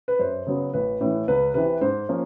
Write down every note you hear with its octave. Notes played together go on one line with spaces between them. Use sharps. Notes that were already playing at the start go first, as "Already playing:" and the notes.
B4
F#2 C5
C#3 F#3 B3
A1 B4
A2 E3
C#2 B4
C3 E3 B4
G#2 C5
F3 A#3 C#4